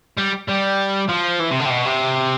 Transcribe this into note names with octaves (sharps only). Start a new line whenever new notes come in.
G3
G3
F3
E3
C3
D3
C3
B2
C3